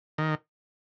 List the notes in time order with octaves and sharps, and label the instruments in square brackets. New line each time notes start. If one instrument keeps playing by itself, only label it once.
[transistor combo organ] D#3